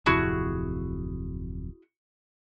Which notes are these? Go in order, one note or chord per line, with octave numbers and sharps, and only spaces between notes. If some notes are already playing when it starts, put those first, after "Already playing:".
D1 F2 C3 E4 F#4 G#4